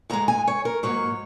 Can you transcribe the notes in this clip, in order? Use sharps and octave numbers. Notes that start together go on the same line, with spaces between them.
G#2 G#3 A#5
G#5
C#5
A#4
G#2 F#3 A#3 C#5